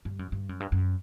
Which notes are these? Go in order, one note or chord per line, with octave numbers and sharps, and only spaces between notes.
G2
F#2
G2
F#2
G2
F#2